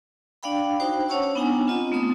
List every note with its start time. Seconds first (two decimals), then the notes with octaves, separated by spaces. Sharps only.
0.43 D4 D5 F5 G5 B5
0.80 D#4 F#4 C5 G5
1.08 C#4 C#5 F#5 A5 C#6 E6
1.35 B3 D4 D#4 F#5 G#5 A#5
1.67 C4 F4 D#5
1.92 A3 B3 C4 C6 D#6